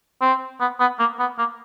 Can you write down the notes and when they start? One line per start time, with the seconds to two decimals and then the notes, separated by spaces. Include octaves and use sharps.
0.21 C4
0.60 B3
0.80 B3
0.99 A#3
1.19 B3
1.38 A#3